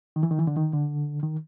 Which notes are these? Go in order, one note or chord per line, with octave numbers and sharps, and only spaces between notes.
D#3
E3
D#3
E3
D3
D#3
D3
D#3